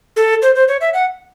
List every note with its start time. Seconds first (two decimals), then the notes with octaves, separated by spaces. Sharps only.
0.16 A4
0.42 C5
0.55 C5
0.68 C#5
0.81 E5
0.94 F#5